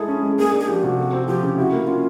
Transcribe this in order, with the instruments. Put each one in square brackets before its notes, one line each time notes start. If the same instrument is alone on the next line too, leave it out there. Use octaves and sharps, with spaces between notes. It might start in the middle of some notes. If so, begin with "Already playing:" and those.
Already playing: [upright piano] G#3 E4 A4 [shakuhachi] G#4
[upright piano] C#4
G#3
[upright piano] A#3 [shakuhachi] G#4
[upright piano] D4
[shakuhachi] G#4
[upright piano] F3 [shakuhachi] G4
[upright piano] C3 [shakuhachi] F#4
[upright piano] A3
C4
[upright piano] F3 [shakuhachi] G4
[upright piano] C#3
[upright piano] E4 [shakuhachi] F#4
[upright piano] A#3
[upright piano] C#4 [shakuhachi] F4